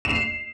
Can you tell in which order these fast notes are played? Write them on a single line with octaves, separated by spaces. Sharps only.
E7 F7 C7